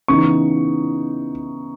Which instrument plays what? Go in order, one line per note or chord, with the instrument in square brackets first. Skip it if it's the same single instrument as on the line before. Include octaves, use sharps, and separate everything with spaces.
[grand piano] C#3 E3 B3 D#4 C#6